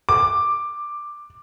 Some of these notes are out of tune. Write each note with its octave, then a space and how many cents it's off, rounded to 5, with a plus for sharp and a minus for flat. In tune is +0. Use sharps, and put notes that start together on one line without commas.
D6 +10